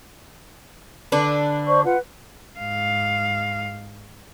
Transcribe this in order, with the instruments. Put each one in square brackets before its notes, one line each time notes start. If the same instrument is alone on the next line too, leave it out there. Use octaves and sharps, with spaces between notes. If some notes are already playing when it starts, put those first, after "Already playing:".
[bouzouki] D3 D4 B4
[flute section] C5 D5 C#6
F4 B4 F#5
[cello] G#2 F5